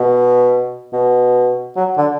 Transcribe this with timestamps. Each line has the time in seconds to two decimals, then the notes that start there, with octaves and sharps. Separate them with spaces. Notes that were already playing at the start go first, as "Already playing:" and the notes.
Already playing: B2
0.93 B2
1.77 F#3
1.98 D3